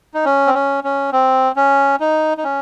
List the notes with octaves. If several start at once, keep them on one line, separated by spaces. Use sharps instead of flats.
D#4
C#4
C4
C#4
C#4
C4
C#4
D#4
D#4
C#4